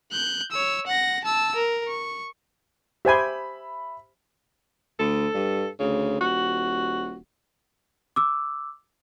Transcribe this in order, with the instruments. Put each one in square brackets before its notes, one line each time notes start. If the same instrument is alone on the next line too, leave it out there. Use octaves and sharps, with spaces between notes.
[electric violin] F#6 G6
C#5 E6
F#5 A#6
A5 E6
A#4
C#6
[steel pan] G4 C5 G#5 [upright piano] E5 B5
[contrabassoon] D2 [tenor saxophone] A4
[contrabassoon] G2
[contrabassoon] D2 [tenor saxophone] C#3
[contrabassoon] D#1 [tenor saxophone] F#4
[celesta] D6 E6